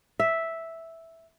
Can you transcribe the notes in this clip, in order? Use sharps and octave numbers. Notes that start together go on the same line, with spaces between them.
E5